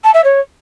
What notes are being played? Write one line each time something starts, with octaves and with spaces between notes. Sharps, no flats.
A5
E5
C#5